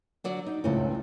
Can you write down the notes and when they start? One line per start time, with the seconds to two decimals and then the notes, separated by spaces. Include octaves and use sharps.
0.24 D3 F#3 D5
0.46 D#4
0.64 C#2 A2 A3 C4 C#4